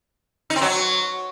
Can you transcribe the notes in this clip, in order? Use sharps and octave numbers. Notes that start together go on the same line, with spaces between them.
D#4
C4
F#3